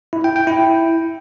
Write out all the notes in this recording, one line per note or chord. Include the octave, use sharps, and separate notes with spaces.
E4
G5
G5
E4